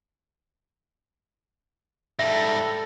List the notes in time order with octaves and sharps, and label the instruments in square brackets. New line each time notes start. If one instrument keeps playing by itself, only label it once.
[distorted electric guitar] G#2 G3 [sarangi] A4 [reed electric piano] E5 [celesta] A#6